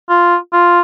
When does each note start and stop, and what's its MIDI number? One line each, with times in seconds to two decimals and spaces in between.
0.09 0.36 65
0.53 0.81 65